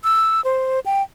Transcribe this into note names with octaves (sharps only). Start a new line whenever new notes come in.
E6
C5
G5